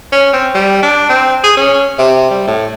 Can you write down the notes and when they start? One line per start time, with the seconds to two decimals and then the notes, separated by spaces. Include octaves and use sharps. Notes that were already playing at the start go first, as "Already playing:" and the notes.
0.12 C#4
0.33 C4
0.55 G3
0.83 D4
1.09 C4
1.44 G#4
1.57 C#4
1.99 C3
2.30 G3
2.47 A2